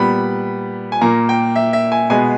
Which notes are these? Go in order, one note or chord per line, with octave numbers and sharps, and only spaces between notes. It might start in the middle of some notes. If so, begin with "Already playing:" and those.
Already playing: A#2 G3 B3 B5
G#5
A#2 A#3 A#5
G5
E5
E5
G#5
B2 G#3 B3 G#5